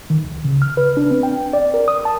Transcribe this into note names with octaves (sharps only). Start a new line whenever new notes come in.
D#3
C#2
C#3
F6
B4
D4
C4
G5
D5
A#4
D#6
A5